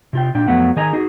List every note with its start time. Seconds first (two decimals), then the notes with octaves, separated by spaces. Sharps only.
0.13 C3 F4 G5
0.35 A#2 D4 G5
0.48 F2 F#3 A3 B3 F#5
0.76 D#3 G#4 D#5 G#5 A#5
0.93 D#4 F#4 G#4